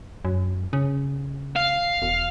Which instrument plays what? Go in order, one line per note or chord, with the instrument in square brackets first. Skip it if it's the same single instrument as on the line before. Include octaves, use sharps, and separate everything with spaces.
[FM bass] F#2
C#3
[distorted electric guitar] F5
[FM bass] E1